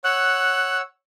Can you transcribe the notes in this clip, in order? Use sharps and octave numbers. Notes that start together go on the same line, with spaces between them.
C#5 F#5 E6 F#6